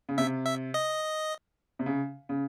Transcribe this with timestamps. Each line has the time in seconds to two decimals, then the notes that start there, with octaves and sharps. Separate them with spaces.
0.09 C#3
0.18 C3 E5
0.46 E5
0.74 D#5
1.79 C3
1.86 C#3
2.29 C#3